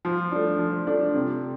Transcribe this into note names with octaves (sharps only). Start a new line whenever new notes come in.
F3
A3 D4
F3
A3 D4
C3